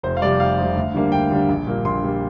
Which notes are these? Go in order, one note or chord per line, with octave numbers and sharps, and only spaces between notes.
F1 C5
F5
F2 C3 G3 D5
F1 F5
F2 C3 G3
D2
D3 G3 A#3 D4
D2 G5
D3 G3 A#3 D4
A#1
A#2 G3 A#3
A#1 C6
A#2 G3 A#3